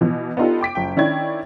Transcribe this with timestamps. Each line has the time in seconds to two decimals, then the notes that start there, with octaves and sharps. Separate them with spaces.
0.01 B2 E3
0.37 B3 D4 D#4 F4 G4 A4
0.61 G5 D6 B6 D7
0.75 F#1 G5
0.97 D#3 C#4 D4 E4 G5 G#6